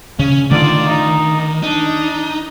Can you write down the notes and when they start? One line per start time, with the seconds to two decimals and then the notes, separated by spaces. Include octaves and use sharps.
0.19 C#3 C#4
0.51 D3 D#3 A3 F4 D5
0.87 D#4
1.63 D4 D#4